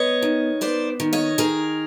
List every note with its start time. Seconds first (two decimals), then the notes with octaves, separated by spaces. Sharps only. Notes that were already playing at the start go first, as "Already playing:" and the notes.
Already playing: B3 C#5 D#5
0.22 D#3
0.61 B3 C5 D5
1.00 D#3
1.13 C#5 D#5
1.38 D#3 G#4 A#4